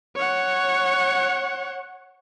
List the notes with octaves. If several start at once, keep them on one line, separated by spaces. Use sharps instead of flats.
C#5 F#5